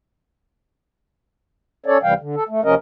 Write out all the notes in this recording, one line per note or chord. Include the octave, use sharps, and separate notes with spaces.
C#4 A4 C#5 D5
D2 C3 E3 G3 F5 G5
D3
A4
A3
D#2 C3 F3 C#4 A#4 D#5